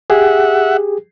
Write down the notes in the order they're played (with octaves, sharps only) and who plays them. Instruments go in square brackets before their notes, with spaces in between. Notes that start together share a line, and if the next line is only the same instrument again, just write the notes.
[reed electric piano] G4 G#4 [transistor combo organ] E5 F#5